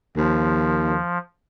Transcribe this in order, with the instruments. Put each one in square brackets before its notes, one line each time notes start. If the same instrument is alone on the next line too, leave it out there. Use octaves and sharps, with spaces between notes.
[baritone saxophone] D#2 [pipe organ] F3